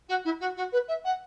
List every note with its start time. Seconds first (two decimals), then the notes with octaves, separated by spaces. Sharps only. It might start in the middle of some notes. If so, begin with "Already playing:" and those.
0.08 F#4
0.24 E4
0.39 F#4
0.56 F#4
0.72 B4
0.87 E5
1.04 F#5